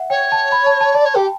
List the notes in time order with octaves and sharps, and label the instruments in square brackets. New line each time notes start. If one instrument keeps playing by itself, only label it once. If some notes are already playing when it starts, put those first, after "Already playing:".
Already playing: [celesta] E5 F#5
[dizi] C#5 [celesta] G5
[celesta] A5
B5
A5
A5
[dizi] D5 [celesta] A5
[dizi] C#5
[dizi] G4 [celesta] G5